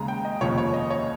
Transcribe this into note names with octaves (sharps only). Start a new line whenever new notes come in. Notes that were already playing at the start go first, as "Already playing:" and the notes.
Already playing: D#2 C#3 G#3 A#5
G5
D#5
F1 D#2 C#3 F3 C#5
C#5
D#5
C#5